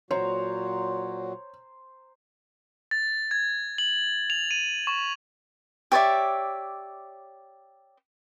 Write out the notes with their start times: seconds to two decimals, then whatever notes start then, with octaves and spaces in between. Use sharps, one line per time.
0.11 A#2 F#3 F#4 C5 C#5 A#5
2.91 A6
3.31 G#6
3.78 F#7
4.30 F7
4.51 D#7
4.87 C#6
5.92 G4 C#5 D5 E5